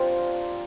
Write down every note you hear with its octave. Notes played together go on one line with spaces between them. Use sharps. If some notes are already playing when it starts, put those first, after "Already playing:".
Already playing: C4 D4 F4 G4 A#4 C5 D5